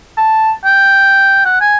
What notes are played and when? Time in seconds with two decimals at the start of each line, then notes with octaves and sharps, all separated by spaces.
0.18 A5
0.65 G5
1.45 F#5
1.61 G#5